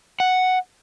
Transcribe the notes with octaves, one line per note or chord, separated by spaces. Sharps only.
F#5